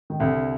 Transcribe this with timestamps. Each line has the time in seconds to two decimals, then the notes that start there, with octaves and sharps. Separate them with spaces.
0.10 D#3
0.20 C2 D3